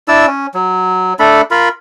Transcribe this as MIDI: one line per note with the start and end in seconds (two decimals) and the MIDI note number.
0.08 0.26 62
0.08 0.26 64
0.08 0.26 74
0.08 0.26 88
0.27 0.47 61
0.54 1.14 54
1.19 1.42 57
1.19 1.42 62
1.19 1.42 69
1.19 1.42 83
1.51 1.69 65
1.51 1.69 70
1.51 1.69 83